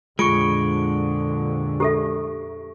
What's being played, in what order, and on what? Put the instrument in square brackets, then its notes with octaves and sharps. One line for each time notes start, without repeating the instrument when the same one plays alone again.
[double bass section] F2 A#2 D3 [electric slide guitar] G#3 [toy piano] F4 [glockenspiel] C#6 C#7 D7
[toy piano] G4 A4 E5